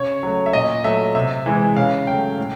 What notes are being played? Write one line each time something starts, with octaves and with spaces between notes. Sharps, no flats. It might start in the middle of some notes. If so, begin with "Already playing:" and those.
Already playing: C#3 C#5
F#3 A3
E5
A#2 D#5
F#3 A3 E5
C3 E5
E3 G#3
C#3 F5
F#3 A3 G5
A2